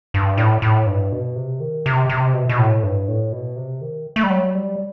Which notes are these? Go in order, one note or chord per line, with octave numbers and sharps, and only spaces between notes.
G2
A2
A2
G2
B2
C3
D#3
C3
C3
B2
B2
A2
G2
A2
B2
C3
D#3
A3
G3
F#3
G3